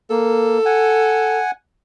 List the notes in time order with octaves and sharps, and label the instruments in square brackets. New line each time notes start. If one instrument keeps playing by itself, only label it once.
[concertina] A#3 [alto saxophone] A4
[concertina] F#5 G#5